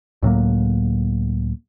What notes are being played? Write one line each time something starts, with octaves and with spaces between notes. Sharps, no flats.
C#2 A2 F#3 A#3